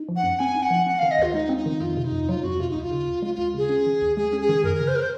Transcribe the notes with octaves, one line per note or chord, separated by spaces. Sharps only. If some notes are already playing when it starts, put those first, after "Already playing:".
Already playing: D#4
F3
F#5
F#2
C4 G#5
D#4
F#5
F3
C4 F#5
D#3 F5
D#5
D#2 F4
G#3 D#4
C4
D#4
D#3
F2 F4
C3
D#4
F2
F#3 F4
F2 F#4
C3 F4
D#2 D#4
F4
C#3
D#2
G#3 F4
D#2 F4
C#3 G#4
C#4
D#3
D#2
G#3 G#4
C#4
G#4
D#3
F#2 A#4
C#3
C5
A#4
C5